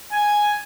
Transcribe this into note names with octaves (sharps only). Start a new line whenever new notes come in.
G#5